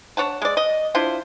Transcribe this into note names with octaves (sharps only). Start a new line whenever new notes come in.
D4 C#5 F#5 A5
G#3 D5
D#5
D4 E4 F4 C5